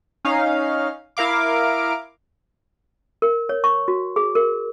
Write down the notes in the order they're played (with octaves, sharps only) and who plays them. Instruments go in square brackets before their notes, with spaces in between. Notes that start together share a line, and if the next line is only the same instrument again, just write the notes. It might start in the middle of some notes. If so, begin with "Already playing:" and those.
[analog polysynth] C#4 D#4 F5
E4 A#4 F5 D6
[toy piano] A#4
C#5
C#6
F#4
G#4
A#4